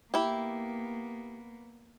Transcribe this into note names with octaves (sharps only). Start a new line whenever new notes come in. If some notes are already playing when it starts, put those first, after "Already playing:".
A#3 B3 E4 G4